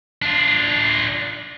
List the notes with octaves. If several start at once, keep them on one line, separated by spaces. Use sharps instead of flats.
D4 F4